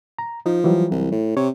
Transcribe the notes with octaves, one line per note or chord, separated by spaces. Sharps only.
A#5
F3 D#4
E3 F#3 G3
C2
A2
C3 C#5